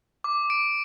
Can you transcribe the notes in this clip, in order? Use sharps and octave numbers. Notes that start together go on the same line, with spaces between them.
D6
D7